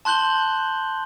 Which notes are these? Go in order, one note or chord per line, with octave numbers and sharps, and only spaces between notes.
A5 C6 F#6 G6 F#7 G7